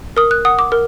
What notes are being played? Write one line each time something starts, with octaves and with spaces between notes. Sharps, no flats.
A#4 D#6
F#6
F#5 D#6
D6
A#4